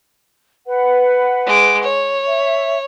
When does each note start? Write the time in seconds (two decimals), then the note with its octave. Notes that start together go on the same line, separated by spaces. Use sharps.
0.67 B4 F#5
1.46 G#3 D6
1.83 C#5
2.25 E5